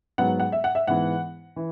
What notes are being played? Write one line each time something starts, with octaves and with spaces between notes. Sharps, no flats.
G#2 F#3 B3 F#5
F#5
E5
F#5
E5
G#2 E3 B3 F#5
E3